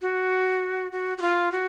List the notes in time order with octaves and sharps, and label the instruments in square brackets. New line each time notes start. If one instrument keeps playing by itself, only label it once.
[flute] F#4
F#4
F#4
F4
F#4